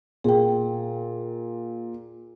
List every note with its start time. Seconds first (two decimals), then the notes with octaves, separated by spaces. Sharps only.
0.24 A#2 G#4 G5